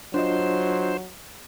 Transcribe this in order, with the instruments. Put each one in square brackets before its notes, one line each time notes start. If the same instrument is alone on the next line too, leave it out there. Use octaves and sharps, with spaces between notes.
[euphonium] F#3 [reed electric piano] D4 F4 D#5 [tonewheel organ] C5